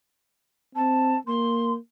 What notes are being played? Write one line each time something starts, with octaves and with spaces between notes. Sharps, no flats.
C4 A5
A#3 C6